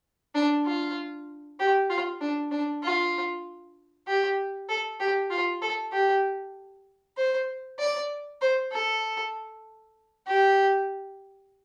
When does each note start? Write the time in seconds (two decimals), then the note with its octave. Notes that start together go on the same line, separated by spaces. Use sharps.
0.35 D4
0.66 F4
1.59 G4
1.90 F4
2.21 D4
2.51 D4
2.83 F4
4.07 G4
4.69 A4
5.00 G4
5.30 F4
5.62 A4
5.92 G4
7.17 C5
7.79 D5
8.41 C5
8.72 A4
10.27 G4